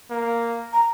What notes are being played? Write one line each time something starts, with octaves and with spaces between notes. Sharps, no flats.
A#3
A#5